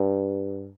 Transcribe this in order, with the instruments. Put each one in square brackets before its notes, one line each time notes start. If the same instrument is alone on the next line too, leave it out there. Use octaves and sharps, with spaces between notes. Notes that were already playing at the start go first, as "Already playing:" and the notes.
Already playing: [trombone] G2